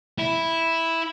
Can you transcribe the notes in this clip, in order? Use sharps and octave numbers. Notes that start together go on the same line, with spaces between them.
E4